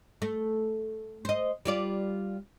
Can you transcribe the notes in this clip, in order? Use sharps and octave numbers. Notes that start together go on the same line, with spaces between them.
A3
C5 D#5
G3 F4 D5